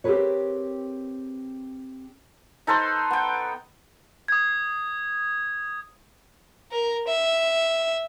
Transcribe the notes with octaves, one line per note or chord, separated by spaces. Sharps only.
C4 G4 G#4 A#4 B4 C#5
D#4 A4 B4 C5
B3 G5
D#6 G#6
A#4
E5